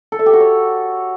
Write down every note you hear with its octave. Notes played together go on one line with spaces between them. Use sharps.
A4
E5
G4
F#4
C#5